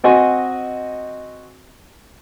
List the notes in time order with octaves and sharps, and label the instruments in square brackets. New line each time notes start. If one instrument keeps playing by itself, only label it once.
[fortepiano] C4 F#4 D#5 G#5